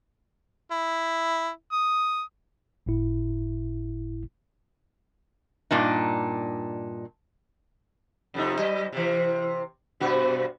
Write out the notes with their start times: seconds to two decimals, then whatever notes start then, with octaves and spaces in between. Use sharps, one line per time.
0.71 E4
1.73 D#6
2.86 G1 A2 E4
5.71 G2 A#2 D4 D#4
8.34 F2 C3 D#4
8.58 F#3 D#5
8.93 C3 E3
10.00 G2 B2 F#4